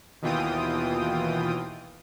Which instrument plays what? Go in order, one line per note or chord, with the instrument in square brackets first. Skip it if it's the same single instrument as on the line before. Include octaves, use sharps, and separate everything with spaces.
[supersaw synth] D#2 B2 E3 F4 G5 D#6